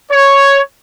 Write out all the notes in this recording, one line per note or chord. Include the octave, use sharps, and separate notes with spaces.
C#5